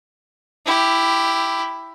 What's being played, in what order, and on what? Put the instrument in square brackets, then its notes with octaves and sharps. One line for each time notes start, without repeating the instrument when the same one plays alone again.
[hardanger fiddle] E4 G4